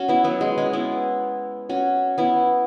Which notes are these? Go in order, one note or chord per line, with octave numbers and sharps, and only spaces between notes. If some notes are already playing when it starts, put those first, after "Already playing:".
Already playing: C#4 F#4
B3 E4
F#3 B3
G#3
G#3 C#4
B3 E4
C#4 F#4
B3 E4